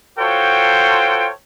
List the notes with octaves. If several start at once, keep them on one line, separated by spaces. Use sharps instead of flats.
F4 F#4 A4 C5 C#5 G5